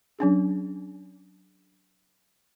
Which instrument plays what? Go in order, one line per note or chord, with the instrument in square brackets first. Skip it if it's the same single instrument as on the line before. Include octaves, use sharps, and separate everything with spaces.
[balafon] F#3 C#4 D4 G#4